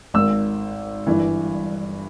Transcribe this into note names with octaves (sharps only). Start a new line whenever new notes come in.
G#1 G#2 D#3 E6
G1 G2 E3